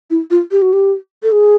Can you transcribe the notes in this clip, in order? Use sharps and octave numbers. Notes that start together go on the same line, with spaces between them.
E4
F4
G4
F#4
G4
A4
G#4